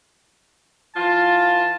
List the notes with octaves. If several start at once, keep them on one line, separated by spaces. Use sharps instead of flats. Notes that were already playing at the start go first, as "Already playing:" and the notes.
E3 F4 A5